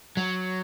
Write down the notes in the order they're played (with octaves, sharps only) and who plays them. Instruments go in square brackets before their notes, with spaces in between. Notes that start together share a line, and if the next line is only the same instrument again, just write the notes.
[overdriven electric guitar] F#3